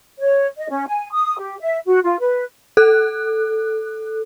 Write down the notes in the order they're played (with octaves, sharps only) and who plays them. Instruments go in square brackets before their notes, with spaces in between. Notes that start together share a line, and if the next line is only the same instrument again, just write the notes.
[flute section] C#5
D#5
C#4
G#5
D#6
G4
E5
F#4
F4
B4
[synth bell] A4 F#6